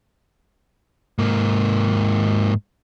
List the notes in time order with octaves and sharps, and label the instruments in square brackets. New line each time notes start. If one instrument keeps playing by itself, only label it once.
[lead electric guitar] G#2 A#3